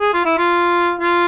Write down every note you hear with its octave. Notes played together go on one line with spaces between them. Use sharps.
G#4
F4
E4
F4
F4